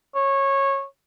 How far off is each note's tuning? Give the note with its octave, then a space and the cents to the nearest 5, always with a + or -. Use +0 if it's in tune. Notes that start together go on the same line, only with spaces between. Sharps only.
C#5 -15